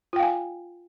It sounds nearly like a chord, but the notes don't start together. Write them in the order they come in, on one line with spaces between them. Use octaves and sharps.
F4 G5 F5 G#5